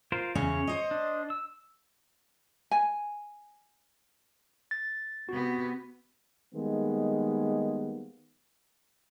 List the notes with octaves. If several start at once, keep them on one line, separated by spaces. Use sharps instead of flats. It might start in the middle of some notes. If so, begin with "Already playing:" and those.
F4 A#4 C5
E2 C#3 C#4 C#5
C5 D#5
D4
E6
G#5
A6
C3 B3 F#4
D#3 G3 G#3 A#3 B3